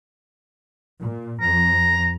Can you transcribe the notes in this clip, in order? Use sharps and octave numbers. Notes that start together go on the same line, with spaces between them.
A#2
F2 A#5